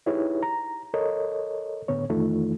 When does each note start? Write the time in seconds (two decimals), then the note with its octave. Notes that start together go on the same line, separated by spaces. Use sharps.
0.06 D#4 E4 G4 G#4 B4 C#5
0.43 A#5
0.94 A4 A#4 C#5 D#5
1.88 A2 D3 B3 C#5
2.10 F2 D#3 E3 A3 D#4 F4